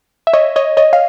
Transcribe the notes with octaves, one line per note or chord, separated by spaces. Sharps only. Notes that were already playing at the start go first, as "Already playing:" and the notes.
E5
C#5 D#5
C#5 D#5
C#5 D#5
F5